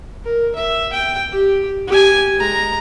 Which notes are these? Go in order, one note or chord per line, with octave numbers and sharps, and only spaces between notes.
A#4
E5
G5
G4
G4 G#5
G#3 A#5